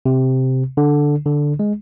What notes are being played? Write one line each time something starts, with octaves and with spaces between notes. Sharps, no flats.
C3
D3
D3
G#3